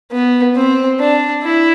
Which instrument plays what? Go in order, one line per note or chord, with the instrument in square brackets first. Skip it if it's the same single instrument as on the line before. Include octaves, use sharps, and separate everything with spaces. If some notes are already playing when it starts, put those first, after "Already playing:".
[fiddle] B3
C4
D4
E4